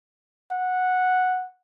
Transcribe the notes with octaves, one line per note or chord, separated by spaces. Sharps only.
F#5